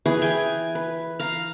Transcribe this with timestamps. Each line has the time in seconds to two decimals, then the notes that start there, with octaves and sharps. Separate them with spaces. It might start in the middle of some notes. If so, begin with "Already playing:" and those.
0.06 E3 G#4 B4
0.22 G5 G#5
0.75 B4
1.19 F5 A#5